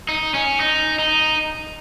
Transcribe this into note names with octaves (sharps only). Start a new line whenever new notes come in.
D#4
C#4
D#4
D#4